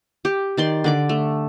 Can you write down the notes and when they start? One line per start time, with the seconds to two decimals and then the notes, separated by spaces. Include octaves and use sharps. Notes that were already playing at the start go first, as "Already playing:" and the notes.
0.25 G4
0.57 D#3 D5 C6
0.84 D3 D5 D6
1.09 A3